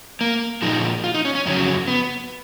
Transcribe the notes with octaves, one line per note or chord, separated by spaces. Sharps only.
A#3
A#2 F3 G#3 D#4
F4
D#4
C#4
C#4
F2 C#3 F#3 C#4
B3